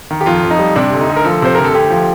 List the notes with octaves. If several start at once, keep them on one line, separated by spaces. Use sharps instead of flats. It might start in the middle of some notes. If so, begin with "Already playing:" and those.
D#3
G4
F2 F4
F2
D#4
G3
C3 D4
D2
D#4
D2
A#4
F3 A4
C3 C5
D2 A#4
A4
D2 G4
F3